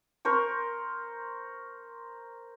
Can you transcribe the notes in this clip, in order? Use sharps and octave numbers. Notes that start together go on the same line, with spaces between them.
A#4 C5 C#6